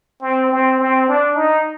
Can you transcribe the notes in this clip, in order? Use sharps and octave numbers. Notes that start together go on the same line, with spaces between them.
C4
C4
C4
D4
D#4